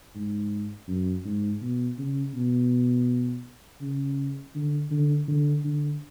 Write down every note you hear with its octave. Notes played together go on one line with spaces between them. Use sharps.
G#2
F#2
G#2
B2
C#3
B2
C#3
D3
D3
D3
D3